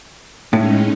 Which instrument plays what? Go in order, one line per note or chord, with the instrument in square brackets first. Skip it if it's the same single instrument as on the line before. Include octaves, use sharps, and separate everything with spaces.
[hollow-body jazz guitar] A2 [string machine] G#3 C#4 D#4